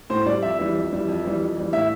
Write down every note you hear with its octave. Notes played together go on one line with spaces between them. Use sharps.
A2 C5
G3 D5
F2 E5
E3 G3
F2
E3 G3
F2
E3 G3
F2
E3 G3
A2 E5